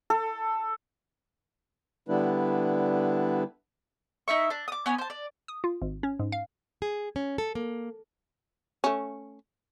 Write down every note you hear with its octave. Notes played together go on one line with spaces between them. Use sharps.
A4
D3 G3 B3 D4 E4 B4
D#4 E4 E5 C#6
D4
D6 D#6
B3 C#4 G#5
C5 A5
D5
D#6
F4
G#1
C#4
G#2
F5
G#4
C#4
A4
A#3
A3 C#4